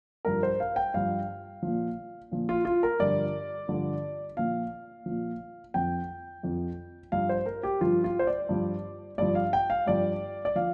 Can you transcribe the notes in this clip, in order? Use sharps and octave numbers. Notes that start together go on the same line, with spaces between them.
G2 F3 A#4
C5
F5
G5
G2 F3 F5
A#2 F3
A#2 F3
F4
F4
A#4
G2 D3 F3 D5
G2 D3 F3
A#2 F3 F5
A#2 F3
F2 F3 G5
F2 F3
G2 F3 F5
C5
A#4
G4
G2 F3 F4
F4
C5
D5
G2 F3
G2 F3 D5
F5
G5
F5
G2 F3 D5
D5
F3 F5